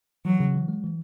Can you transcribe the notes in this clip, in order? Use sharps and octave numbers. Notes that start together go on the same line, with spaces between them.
E3 F#3
C#3
E3
G#3
E3